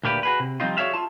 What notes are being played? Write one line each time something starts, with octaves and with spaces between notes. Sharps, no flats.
D2 A#2 A#3 G4 B4 D5
F#4 G#4 B4
C3
F3 G3 C4 D#4 F4
F#4 G#4 C#5 D5 E5 F5
F4 A5